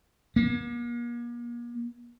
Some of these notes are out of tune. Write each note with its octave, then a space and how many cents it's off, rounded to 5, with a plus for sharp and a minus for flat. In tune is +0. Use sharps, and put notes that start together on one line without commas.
A#3 +40